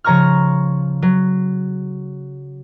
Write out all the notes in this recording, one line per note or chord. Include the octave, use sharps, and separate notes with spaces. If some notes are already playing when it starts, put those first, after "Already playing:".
C#3 F3 C#5 A#5 C#6 F6
F#3